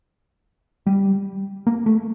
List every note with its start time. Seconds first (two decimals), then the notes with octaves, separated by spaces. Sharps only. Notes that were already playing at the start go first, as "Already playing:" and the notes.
0.87 G3
1.67 A#3
1.86 A3